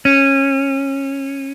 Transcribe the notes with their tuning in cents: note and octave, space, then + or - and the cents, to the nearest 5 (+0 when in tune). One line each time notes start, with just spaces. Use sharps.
C#4 -20